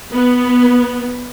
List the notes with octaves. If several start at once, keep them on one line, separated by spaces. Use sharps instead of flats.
B3